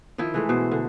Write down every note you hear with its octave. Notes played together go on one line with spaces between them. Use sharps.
D#3 F3 E4 G5
E3 G#3 A3
B2 C5
D3